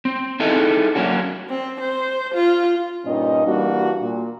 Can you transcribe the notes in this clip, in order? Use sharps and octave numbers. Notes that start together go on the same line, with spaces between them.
C4
D#4 E4 G#4 A4 D#5 E5
F#3 A#3 C#4 D4 F#4
C4
C5
F4
G2 A#2 C#4 D#4 D#5
E3 G3 A#3 D4 F#4
A#2